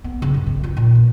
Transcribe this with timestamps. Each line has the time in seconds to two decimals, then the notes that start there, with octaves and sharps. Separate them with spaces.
0.04 B3
0.22 C#3
0.34 F#2
0.47 G2
0.64 F4
0.77 A#2
0.95 E2